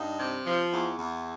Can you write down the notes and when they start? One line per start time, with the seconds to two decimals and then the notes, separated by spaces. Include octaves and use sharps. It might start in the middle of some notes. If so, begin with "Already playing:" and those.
Already playing: G2 D#4
0.19 C3
0.46 F3
0.72 E2
0.97 E2